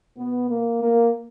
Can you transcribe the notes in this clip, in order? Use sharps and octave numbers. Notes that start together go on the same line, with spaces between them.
B2 B3
A#3
A#3